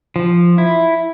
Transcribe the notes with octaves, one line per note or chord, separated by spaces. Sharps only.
F3
E4